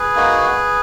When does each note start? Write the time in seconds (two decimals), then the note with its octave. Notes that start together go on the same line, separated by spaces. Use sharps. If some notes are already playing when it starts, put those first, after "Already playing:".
Already playing: G#4 B4
0.15 A#3 D#4 F#4